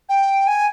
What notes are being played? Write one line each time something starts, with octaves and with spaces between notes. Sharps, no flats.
G5
G#5